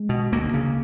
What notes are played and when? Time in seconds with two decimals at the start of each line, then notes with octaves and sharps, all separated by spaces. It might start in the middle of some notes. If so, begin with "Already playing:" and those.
Already playing: G#3
0.09 B2
0.32 D2 A#3
0.54 C#3